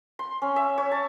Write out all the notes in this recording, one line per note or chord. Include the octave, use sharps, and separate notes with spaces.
C6
C#4
E5
C#5
A5